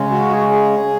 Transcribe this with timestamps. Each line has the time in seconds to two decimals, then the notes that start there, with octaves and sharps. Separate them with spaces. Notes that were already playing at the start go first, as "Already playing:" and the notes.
Already playing: C#3 G#3 C#4
0.11 F#4
0.31 G#4
0.50 G#4